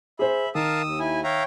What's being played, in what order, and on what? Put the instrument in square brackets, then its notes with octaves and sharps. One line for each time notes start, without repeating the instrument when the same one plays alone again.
[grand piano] G#4 C5 [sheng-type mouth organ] E5 B5
[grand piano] D#3 [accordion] A#4 F5 A5 [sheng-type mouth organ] D#6 E6
[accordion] D#2
[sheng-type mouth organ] E4 G#5
[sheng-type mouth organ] C#5 G5 [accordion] E5 F5 A#5